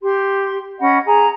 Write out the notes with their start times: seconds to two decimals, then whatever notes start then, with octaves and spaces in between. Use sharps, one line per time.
0.02 G4 C6
0.80 C#4 D#5 F#5 B5
1.06 G#4 A#5